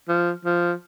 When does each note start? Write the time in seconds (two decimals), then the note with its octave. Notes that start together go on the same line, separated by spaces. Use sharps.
0.08 F3
0.45 F3